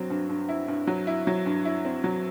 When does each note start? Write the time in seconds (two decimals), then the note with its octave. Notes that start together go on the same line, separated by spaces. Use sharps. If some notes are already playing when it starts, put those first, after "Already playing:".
Already playing: G2 F#3 C4
0.10 G2
0.29 G2
0.49 E4
0.68 G2
0.87 F#3
1.07 E4
1.27 F#3
1.46 G2
1.65 E4
1.85 C4
2.04 F#3